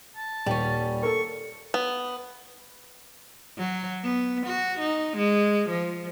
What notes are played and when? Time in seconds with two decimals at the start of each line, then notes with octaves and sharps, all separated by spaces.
0.17 A5
0.46 D#1 G3 C#4
1.03 A4 A#4 C#6
1.74 B3
3.57 F#3
4.03 B3
4.47 F#4
4.80 D#4
5.17 G#3
5.70 F3